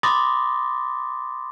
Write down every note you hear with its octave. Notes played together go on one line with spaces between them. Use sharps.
B5 C6 D6 D#6 A6 A#6